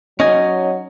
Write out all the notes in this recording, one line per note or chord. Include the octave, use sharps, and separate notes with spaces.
F#3 C#4 D#4 D#5 G#5